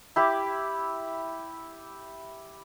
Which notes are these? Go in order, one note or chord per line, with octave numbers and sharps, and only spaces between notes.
E4 G4 D6